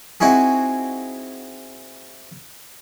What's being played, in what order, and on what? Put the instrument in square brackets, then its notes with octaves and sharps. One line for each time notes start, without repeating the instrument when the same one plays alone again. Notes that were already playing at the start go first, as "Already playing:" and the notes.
[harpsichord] C4 D#4 E4 F#4 G#4